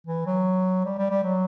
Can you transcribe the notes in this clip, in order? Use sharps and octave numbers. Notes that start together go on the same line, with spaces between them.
E3
F#3
G3
G3
G3
F#3